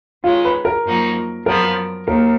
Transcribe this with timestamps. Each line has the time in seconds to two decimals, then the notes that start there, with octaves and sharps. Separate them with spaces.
0.24 D#3 G#3 C#4 F4
0.45 B4
0.65 A#4
0.85 F#2 F3 A#3 D#4 F#4
1.46 F#2 F3 B3 A#4
2.07 D#2 A#4